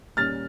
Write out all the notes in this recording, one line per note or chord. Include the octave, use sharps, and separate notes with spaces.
A#2 G3 A#3 C#4 F6 A6